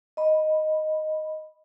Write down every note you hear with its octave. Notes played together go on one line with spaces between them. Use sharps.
D#5 B5